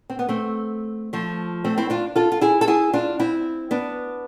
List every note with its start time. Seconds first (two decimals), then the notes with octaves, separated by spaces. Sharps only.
0.10 C4
0.19 B3
0.29 A3 C4
1.13 F3 A3
1.65 A3 C4
1.77 C4 E4
1.90 D4 F4
2.16 F4 A4
2.32 F4
2.41 E4 G#4
2.61 A4
2.67 E4 G#4
2.93 D4 F4
3.19 C4 E4
3.71 B3 D4